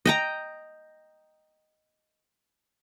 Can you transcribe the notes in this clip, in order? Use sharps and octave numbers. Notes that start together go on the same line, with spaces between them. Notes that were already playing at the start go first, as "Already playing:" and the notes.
D#5 G5 A#5